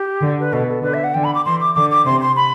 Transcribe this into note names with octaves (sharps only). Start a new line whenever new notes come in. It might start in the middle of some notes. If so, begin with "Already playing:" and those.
Already playing: G4
D3
B4
B2 A4
A4
D3 B4
E5
F#5
D3 G5
B5
D6
E3 C6
D6
D3 D6
D6
C3 C6
C6
B5